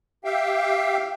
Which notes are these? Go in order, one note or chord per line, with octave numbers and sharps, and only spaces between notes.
G4 E5 F5 G5